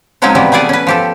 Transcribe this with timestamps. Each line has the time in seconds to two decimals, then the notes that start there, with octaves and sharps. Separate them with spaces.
0.22 F3 F#3 G#3 C4 C#4 D#4
0.35 C3 E3 F3 G3 B3 C#4
0.52 A3 B3 G#4 D5 F#5
0.69 C#4 B4
0.87 F3 G4 A4